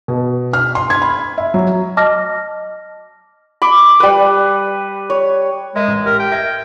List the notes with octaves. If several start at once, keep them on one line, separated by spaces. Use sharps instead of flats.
B2
F6
C6
G#6
B5
E5
F#3
D#5 A5 D6 F6 A#6
B5 D6
G3 B4
C#5
G#3 A#4 D#5 E5
A1
G4 A#4
G5
E5 G#6 A#6